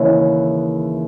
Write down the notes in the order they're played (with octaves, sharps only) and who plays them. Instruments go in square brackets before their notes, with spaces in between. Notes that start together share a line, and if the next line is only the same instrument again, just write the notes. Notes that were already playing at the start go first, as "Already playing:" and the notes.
Already playing: [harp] D#2 C#3 E3 E4 G#4